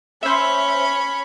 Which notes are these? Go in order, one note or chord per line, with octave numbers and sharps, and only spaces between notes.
C#4 C5 C#5 E5 B5